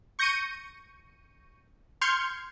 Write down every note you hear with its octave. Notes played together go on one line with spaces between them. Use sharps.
C#6 G6 A#6 C#7 D#7
C6 F6 G6 G#6 C#7